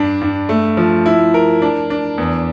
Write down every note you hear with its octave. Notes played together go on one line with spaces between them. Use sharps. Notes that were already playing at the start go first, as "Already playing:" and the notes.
Already playing: G2 D4
G2
A3
F3
E4
A#4
D4
D4
E2